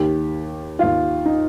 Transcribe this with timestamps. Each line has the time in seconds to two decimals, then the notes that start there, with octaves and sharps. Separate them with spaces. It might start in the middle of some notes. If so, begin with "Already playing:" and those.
Already playing: D#2 D#3 G4
0.79 D#2 D#3 F4
1.26 D#4